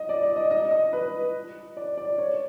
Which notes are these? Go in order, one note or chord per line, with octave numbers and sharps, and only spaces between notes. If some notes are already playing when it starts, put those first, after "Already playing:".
Already playing: D#5
D5
D5
D#5
D#5
D#5
B4
D5
D5
C#5